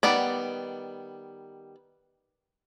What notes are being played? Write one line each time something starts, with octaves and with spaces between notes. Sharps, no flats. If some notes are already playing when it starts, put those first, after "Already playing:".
D#3 G3 B3 D5